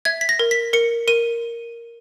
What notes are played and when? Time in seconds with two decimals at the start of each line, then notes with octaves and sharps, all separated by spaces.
0.05 E5 G#6
0.21 B6
0.29 A#6
0.39 A#4
0.51 B6
0.73 A#4 C#7
1.08 A#4 D#7